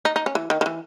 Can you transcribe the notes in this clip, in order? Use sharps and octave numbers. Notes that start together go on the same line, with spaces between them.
D#4
D#4
C#4
E3
D#3
D#3
E3